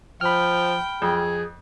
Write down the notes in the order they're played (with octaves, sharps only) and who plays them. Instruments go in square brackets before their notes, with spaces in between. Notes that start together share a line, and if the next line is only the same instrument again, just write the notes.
[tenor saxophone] F3 [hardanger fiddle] G5 [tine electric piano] B5 F6
[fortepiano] F2 [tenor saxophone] G#4